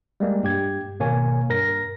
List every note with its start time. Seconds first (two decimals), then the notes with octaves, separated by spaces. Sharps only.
0.20 G3 G#3 A#3
0.43 G2 G4 G#6
1.00 G#1 B2 A#3 C#5 G#5
1.49 G2 A#4 A#6